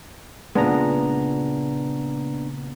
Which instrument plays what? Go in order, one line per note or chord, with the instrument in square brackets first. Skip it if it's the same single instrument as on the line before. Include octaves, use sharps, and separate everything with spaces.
[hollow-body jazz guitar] A#2 C#3 G#3 [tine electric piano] B3 D4 A#5